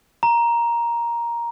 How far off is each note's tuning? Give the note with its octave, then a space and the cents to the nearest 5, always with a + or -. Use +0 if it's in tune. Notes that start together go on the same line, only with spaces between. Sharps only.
A#5 +10